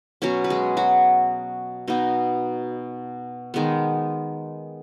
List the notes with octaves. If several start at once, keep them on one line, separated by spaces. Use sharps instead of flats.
B2 F#3 B3 C#4 C#5
B4
G#3 G#4
F#3 F#4
B2 B3 D#4
D#3 G#3 B3